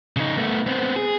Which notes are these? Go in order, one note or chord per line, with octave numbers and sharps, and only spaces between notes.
C#3 D#4
A3 B3
B3 C4
G#4